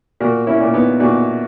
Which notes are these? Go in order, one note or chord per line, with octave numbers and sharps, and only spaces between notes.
A#2 F#4 A#4
C#4 E4
A#2
B3 D#4
A#2 D#4 F#4